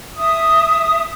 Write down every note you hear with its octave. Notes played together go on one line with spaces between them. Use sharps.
E5 D#6